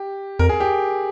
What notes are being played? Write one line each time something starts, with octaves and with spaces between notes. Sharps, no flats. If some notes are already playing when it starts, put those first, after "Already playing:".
Already playing: G4
F2 A#4
G#4
G4